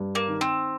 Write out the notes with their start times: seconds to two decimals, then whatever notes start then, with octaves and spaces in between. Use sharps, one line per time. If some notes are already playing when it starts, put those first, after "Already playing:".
Already playing: G2
0.15 A#3
0.28 D#3
0.41 C4